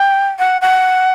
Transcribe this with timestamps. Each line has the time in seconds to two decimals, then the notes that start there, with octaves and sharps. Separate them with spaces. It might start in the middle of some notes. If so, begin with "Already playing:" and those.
Already playing: G5
0.38 F#5
0.61 F#5